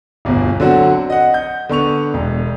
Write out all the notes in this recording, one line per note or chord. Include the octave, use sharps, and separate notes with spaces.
D1 G1 E2 B2
D3 F#3 C4 F#4
D#5 F#5
G6
D3 B3 C#6 F7
E1